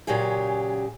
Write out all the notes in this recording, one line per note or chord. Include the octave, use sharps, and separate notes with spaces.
A#2 C#3 F#3 G4 G#4